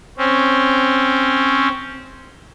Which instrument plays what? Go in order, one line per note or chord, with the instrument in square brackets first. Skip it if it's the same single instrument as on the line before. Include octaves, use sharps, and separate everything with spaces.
[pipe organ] C4 C#4